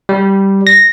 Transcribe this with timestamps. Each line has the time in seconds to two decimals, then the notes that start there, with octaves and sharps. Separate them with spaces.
0.09 G3
0.67 A#6